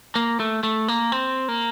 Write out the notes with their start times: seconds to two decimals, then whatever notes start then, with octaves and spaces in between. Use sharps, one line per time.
0.15 A#3
0.40 A3
0.63 A3
0.88 A#3
1.12 C4
1.48 A#3